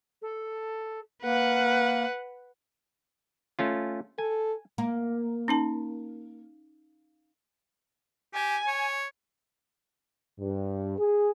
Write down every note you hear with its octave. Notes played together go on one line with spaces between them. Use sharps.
A4
A#3 B4 F#5
A3 C#4 F4
A4 G#5
A#3
C#4 D#4 A5
G4 G#5
C#5
G2
G#4